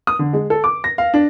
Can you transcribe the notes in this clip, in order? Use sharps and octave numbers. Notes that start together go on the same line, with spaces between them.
D#6
D3
G#3
A4
D6
A#6
F5
D4